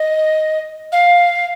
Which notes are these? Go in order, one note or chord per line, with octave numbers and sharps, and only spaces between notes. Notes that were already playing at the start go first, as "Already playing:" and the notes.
Already playing: D#5
F5